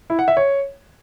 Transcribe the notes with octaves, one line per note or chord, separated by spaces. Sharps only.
E4
F#5
E5
C#5